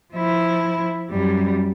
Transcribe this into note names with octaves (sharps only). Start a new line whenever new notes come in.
F3 E4
F#2 G3